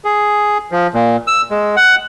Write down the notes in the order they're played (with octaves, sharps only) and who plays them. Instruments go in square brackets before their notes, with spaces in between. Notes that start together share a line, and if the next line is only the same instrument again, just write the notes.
[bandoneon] G#4
F3
A#2
E6
G#3
F#5